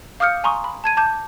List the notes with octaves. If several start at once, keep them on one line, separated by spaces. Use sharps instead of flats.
F5 D6 D#6 F6 G6 C#7
G#5 A#5 C6 C#6 D#6
B5
A5 G#6 D#7
A5 D6 G6